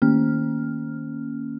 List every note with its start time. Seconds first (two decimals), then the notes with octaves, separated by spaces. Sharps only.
0.02 D#3 A#3 C#4 F6